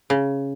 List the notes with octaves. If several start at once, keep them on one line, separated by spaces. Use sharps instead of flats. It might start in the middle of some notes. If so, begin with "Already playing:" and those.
C#3